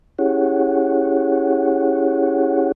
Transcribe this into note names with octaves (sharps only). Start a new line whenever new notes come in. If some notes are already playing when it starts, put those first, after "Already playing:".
C#4 E4 G4 G#4 C#5 F#5